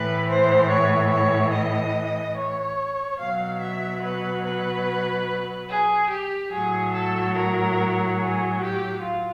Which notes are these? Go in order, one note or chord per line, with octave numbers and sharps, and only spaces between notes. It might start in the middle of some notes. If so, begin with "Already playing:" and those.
Already playing: A2 E3 B4
C5
C#5
C#5
D#5
C#5
B2 F#3 F5
E5
B4
B4
G#4
G4
A2 F#3 G#4
A4
A#4
G#4
G4
F4